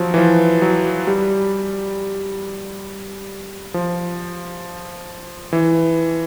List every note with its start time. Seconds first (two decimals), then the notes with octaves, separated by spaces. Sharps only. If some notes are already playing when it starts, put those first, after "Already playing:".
Already playing: F3 F#3
0.14 E3
0.18 F3
0.62 F#3
1.07 G3
3.74 F3
5.53 E3